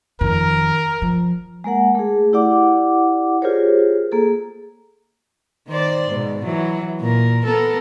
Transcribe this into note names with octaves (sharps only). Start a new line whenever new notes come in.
F2 D#3 A#4
F3
G#3 A#3 A#4 F#5
A3 G#4
E4 G4 D5 F#5 D6
F4 G4 G#4 A#4 C5 C#5
A#3 G#4 A4
D#3 C5 D5
G#2 B2
E3 F#3
A#2 A#4
B3 A4 A#4